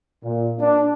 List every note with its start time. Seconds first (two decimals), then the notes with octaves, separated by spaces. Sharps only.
0.23 A#2
0.59 D4